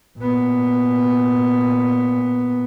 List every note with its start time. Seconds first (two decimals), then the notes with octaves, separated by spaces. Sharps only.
0.19 A#2 B3